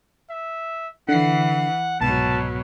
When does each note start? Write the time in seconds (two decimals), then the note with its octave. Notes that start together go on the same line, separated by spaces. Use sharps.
0.30 E5
1.09 D3 E3 F#5 C7
2.01 C2 G#2 B2 F#3 A5